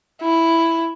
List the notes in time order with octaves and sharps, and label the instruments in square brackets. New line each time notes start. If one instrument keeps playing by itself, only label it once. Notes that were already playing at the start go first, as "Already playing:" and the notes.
[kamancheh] E4